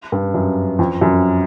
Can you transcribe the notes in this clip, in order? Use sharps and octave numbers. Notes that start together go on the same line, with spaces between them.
G2
F#2
F2
F#2